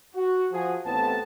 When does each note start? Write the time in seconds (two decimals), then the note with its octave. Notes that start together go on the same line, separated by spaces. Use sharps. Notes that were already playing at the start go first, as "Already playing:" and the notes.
0.15 F#4
0.51 F3 F#4 G#4
0.86 A1 A2 B3 C4 A5